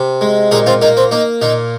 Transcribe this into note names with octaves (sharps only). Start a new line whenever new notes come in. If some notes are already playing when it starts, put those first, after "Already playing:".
Already playing: C3
G#3
A#2 D#4 G#4
C4 F4
A#3 D#4
C4
A#3 D#4
A#2 D#4